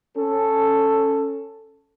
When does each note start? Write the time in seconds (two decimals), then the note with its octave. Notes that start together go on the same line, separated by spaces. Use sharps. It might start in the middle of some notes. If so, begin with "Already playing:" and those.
0.17 C#4 A4